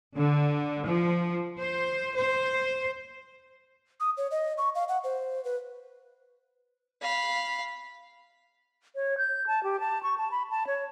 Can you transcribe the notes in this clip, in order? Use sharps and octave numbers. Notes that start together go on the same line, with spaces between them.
D3
F3
C5
C5
D#6
C#5
D#5
C#6
F5
F#5
C5
B4
F5 B5
C#5
G6
A5
G4
A5
C#6
A5
B5
A5
C#5